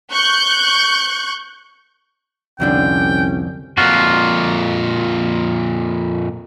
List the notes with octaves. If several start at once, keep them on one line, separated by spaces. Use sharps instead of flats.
C#6 F#6 G6
C2 F2 D3 C#4 D4 G5
F2 A#2 F4 F#4